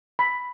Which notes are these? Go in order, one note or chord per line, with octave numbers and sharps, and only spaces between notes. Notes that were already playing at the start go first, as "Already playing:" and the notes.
B5